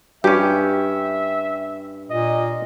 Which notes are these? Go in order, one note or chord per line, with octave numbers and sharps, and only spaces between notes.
G2 C#4 G4 E5
A#2 D#5